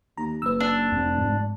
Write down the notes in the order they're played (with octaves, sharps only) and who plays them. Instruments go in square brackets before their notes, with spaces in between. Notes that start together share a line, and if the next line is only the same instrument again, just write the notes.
[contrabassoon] D#2 [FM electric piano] A#5
[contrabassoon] F#1 [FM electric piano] B4 E6
[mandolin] D4
[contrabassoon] F1 [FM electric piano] F2
[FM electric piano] G#2